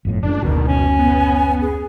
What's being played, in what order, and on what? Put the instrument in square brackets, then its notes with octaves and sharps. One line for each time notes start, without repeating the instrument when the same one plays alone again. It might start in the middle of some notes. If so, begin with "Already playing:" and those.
[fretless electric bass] G1 F2 A2
[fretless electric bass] F#1 [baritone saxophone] C#2 [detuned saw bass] D4
[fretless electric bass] F#1 D2 [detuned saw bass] B2 [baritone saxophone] D#3
[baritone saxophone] C#4 [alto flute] G#5
[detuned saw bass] B3
[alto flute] G#4